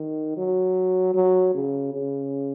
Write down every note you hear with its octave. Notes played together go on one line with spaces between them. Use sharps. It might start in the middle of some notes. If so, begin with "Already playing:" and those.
Already playing: D#3
F#3
F#3
C#3
C#3